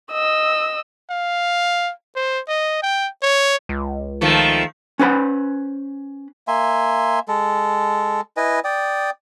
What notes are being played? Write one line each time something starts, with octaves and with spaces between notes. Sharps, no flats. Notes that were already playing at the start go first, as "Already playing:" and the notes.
D#5 E6
F5
C5
D#5
G5
C#5
C#2
D#3 F3 A3
C#4 B4 C5 B5
A#3 E5 G#5 C6
G#3 A4
E4 B4 D#5 G#5
D5 G5 D#6